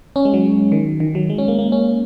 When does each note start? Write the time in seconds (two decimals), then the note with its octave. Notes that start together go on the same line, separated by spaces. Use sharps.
0.16 C#4
0.25 G#3
0.34 F#3
0.72 D#3
1.00 D#3
1.15 F#3
1.30 G#3
1.38 C#4
1.48 A#3
1.59 A#3
1.72 C#4